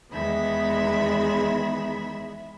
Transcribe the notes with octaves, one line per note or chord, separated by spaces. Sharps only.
E2 D#3 G#3 B3 E5 B5